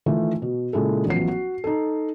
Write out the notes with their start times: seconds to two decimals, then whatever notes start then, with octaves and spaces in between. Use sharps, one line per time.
0.06 D#3 E3 A3 F4
0.42 B2
0.73 A#2 C#3 G#3 E4 A4
1.06 A1 F3 F#3 B3 C7
1.28 F#4
1.64 D#4 A4